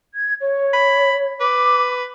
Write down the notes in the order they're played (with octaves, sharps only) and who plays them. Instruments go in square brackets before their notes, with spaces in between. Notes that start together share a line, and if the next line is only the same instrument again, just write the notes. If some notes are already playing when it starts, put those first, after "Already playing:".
[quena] G#6
C#5
[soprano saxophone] B5
[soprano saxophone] B4 [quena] D6